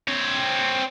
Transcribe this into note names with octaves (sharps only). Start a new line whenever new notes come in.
C4 C#5